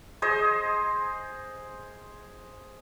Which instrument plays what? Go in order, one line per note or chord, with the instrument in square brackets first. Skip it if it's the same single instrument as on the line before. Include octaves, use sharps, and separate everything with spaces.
[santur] G#4 C5 D#5